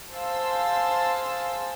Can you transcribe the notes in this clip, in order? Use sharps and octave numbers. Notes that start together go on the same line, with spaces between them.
G#4 C5 F5 A5 C6 E6